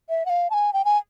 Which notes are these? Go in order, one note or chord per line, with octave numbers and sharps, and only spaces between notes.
E5
F#5
F5
A5
G#5
G5
G#5